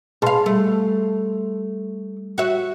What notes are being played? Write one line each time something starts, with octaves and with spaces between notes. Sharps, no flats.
B2 G#4 F5 A5 C6
G3 A3
F#4 E5